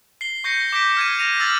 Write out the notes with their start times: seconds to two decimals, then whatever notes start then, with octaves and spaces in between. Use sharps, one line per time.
0.21 C7 G7
0.44 C#6 G6 A#6 C7 C#7
0.72 D6 G6 A#6 B6 D7
0.97 F6 G#6 D#7
1.19 A#6 D#7 F7
1.40 E6 F6 A6 B6 F#7